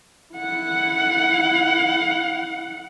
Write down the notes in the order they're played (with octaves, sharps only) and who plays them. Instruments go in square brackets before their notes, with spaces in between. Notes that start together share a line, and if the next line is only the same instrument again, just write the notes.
[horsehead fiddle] E4 F#5